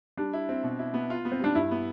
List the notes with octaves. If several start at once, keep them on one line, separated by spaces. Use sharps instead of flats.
G3 D4
E4
C4
B2
E4
B3
F4
B3
C4
G3 D4
G2 E4
B3